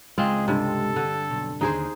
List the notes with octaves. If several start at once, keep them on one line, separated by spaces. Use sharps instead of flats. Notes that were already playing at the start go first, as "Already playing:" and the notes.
C#2 G#3 C4 F4 G#4 D#5
G2 C3 A4
D3
B1
D#2 D3 D#4 G#4 C5